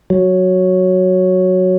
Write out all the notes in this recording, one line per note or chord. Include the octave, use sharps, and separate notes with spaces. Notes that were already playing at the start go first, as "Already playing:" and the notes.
F#3